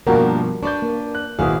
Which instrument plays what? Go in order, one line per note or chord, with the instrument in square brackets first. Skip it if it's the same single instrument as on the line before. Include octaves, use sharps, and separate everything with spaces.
[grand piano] G2 B2 F3 [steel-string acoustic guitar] A#3 D4 G4 [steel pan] F#4 A#4
[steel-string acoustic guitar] D4 B4 D5 [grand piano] C#6 G6
[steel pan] A#3
[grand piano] F#6
[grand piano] G#1 E4 B4 [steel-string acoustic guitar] A#2 F#4 F5 [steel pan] G#4